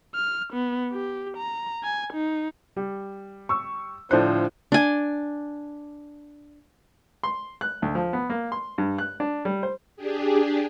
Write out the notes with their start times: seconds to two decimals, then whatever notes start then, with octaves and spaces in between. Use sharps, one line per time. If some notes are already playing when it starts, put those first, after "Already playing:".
0.15 F6
0.53 B3
0.93 G4
1.37 A#5
1.84 G#5
2.13 D#4
2.76 G3
3.49 C#6 E6
4.11 A2 D3 F3 D4 C5 F#6
4.72 D4 G#5
7.23 C6
7.61 F#6
7.82 D2
7.95 F3
8.13 B3
8.30 A#3
8.52 C6
8.78 G2
8.98 F#6
9.20 D4
9.45 G3
9.63 C5
9.96 D4 G4 G#4